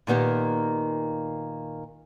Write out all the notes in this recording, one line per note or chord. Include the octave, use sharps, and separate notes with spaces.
A#2 D#3 A#3 B3 D#4 G4